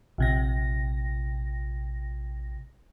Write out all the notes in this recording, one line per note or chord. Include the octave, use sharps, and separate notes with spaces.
A#1 C3 A#6